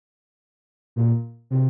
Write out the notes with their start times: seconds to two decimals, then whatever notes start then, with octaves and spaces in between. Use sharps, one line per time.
0.96 A#2
1.50 C3